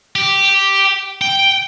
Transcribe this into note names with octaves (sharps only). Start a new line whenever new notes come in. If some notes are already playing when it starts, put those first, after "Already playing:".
G4
G5